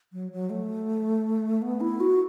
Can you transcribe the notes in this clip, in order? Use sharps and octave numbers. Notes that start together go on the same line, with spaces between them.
F#3
F#3
A3
B3
E4
F#4